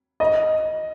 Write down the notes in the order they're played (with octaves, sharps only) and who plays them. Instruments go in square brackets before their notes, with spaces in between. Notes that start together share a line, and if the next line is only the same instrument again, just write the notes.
[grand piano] D#5